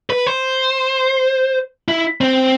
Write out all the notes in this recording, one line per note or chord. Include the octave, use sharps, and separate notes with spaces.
B4
C5
E4
C4